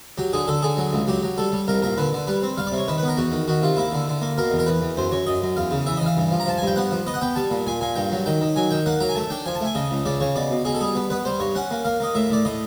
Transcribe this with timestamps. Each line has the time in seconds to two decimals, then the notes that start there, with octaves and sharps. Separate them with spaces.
0.18 F#3 G4
0.33 D3 G#4
0.48 D3 A4
0.62 D3 G#4
0.77 F#3
0.93 C#2
1.07 F#3 G4
1.23 F#3
1.37 G3 A4
1.52 G3
1.68 C2 A#4
1.82 A#2 A#4
1.97 D3 B4
2.13 D3
2.27 G3 B4
2.42 C4
2.57 G3 F5
2.67 D5
2.72 C3
2.78 C#5
2.88 D#3 B4
2.98 B4
3.03 B3 A#4
3.17 E2 F#4
3.32 D#3
3.48 D#3 F#4
3.62 C3 F4
3.77 A#3 E4
3.92 D3
4.08 D3
4.21 A#3
4.37 B2 A#4
4.52 E2
4.59 A#4
4.66 E2 B4
4.82 E2
4.97 F#2 C5
5.11 F#2 C#5
5.27 F#2 D#5
5.42 F#2
5.57 E2 F5
5.71 C#3
5.87 E3 E5
5.97 E3 D#5
6.06 F5
6.17 G2
6.31 F3
6.40 A#5
6.46 F3 A5
6.58 G#5
6.62 G2
6.67 G5
6.76 B3 F#5
6.91 F3
7.06 B3 D#5
7.14 F#5
7.21 B3 G5
7.36 G3 A5
7.51 A#2
7.66 A#2 G#5
7.81 A#2 G#5
7.96 G2 G5
8.12 F#3
8.26 D#3 G5
8.41 D#3
8.56 F#3 G#5
8.71 D#3 G5
8.86 A#3 F#5
9.00 F#3 A#5
9.09 G#5
9.15 A3 A5
9.30 D4 G5
9.46 F3 G#5
9.55 A5
9.61 A3 G#5
9.75 C#3 D#5
9.91 C#2
10.06 C#3 D5
10.20 C#3 C#5
10.36 B2 D5
10.51 B2
10.65 B2 G#4
10.74 A4
10.80 G3 G#4
10.95 B3
11.10 B3 B4
11.25 G3 C5
11.40 G2 C#5
11.55 C#4 F#5
11.71 A#3
11.85 A#3 F5
12.00 A#3 D#5
12.15 A2 E5
12.29 A2 D5
12.45 A2 D#5